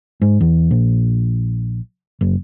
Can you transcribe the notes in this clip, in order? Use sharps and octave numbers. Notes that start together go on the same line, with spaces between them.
G#2
E2
A#1
F#1